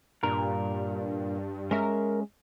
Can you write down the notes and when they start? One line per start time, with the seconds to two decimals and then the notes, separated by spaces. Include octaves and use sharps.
0.23 G2 A#2 A#4
1.71 G#3 C#4 A#4 E5